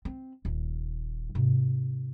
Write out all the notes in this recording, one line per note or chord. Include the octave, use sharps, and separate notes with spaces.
C4
D#1
G#2 C3